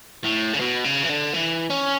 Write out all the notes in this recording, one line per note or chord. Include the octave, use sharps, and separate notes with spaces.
A2
C#3
B2
C#3
E3
D3
E3
C#4